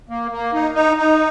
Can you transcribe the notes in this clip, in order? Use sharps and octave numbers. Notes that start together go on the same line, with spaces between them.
A#3
A#3
D#4
D#4
D#4